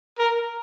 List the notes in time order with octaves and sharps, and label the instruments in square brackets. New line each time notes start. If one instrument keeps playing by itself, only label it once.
[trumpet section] A#4